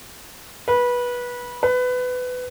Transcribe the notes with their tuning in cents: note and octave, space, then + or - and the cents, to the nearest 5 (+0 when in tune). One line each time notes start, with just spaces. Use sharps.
B4 -20
B4 +20